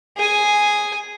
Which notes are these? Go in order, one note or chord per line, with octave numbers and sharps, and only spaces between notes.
G#4 G#5